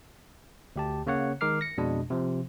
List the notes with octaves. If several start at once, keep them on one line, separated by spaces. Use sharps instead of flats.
D2 G4 A5
C#3 A#3 C#5 F#5
D#3 G#3 A#4 D6 F6 C7
A#6 C#7
F2 B2 G#3 D4 D#5
C3 F3